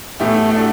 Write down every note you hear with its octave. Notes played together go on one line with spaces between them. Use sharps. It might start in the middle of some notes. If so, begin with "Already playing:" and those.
A2 E3 A3 B3 E4 G4
A3 D4 F#4 A4